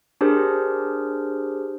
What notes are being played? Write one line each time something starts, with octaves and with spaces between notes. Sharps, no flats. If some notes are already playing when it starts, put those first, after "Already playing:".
D4 G4 G#4 A#4 C5